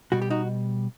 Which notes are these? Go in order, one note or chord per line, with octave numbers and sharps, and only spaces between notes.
B2 G3 F#4
G4
D#4 F#4